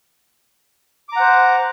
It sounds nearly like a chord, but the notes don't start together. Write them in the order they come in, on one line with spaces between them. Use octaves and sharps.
D6 A#5 F#5 C5